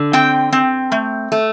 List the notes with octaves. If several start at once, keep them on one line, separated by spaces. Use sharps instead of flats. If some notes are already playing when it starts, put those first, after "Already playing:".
Already playing: D3
C4 G5
C4
A3
A3